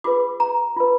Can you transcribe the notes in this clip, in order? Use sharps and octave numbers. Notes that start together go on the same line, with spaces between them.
F4 G#4 B4 D6
A#5
F4 B4